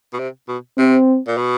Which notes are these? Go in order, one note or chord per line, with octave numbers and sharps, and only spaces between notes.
B2
C3
B2
C3 C4
A#2
B2